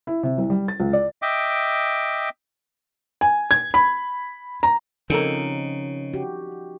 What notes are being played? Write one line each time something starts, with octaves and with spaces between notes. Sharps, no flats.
E4
C3
C2
G3
A6
C#2
D5
D#5 E5 G5 D6
G#5
G#6
B5
A#5
C#3 F3 C4 C#4 D#4 A4 A#4
F#4 G4